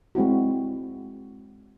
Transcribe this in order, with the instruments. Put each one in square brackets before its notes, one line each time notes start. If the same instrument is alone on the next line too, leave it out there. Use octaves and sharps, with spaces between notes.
[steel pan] G#3 C4 E4 F#4